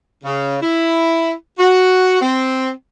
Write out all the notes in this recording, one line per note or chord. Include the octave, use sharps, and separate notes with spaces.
C#3
E4
F#4
C4